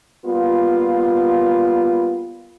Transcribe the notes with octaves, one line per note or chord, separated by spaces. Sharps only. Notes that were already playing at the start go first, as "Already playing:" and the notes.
G3 A#3 B3 F4